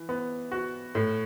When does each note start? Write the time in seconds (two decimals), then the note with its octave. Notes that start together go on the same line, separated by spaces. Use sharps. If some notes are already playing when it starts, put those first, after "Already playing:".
Already playing: E3
0.09 B3
0.52 F#4
0.95 A2